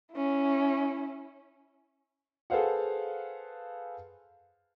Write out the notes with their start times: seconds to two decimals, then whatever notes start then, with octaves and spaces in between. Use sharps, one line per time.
0.13 C#4 E4
2.50 G#4 A4 B4 C5 F5 F#5